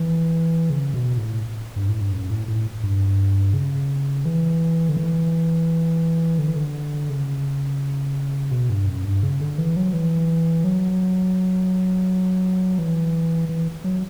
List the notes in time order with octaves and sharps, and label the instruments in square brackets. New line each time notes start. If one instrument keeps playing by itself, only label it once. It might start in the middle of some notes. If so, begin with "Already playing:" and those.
Already playing: [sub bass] E3
C#3
B2
A2
G2
A2
G2
F#2
A2
A2
G2
C#3
E3
D3
E3
D3
E3
D3
C#3
B2
G2
F#2
G2
C#3
D3
E3
F#3
E3
F#3
E3
E3
F#3